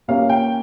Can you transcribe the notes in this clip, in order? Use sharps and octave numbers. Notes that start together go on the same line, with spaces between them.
A#2 G3 A#3 C#4 F5
G5